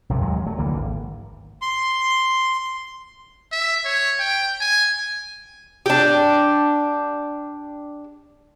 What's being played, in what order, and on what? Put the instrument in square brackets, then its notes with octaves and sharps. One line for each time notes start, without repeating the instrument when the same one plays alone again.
[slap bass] B1 F#2 C3 F3
D#2 F#3 G#3
F#3 A3
D2 D3 E3 A#3
G#1
[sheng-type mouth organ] C6
[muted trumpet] E5
C#5
G5
G#5
[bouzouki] D4 G4